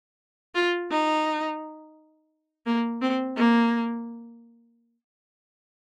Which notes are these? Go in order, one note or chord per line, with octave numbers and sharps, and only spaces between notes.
F4
D#4
A#3
C4
A#3